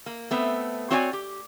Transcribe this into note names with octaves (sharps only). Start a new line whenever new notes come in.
A#3
A3 B3 C4
C4 F#4 C#5 D5 E5 G#5
G4